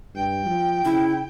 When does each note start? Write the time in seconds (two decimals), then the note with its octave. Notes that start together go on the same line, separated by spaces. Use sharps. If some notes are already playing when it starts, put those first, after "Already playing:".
0.15 G2 G5
0.46 F3
0.85 C#3 E4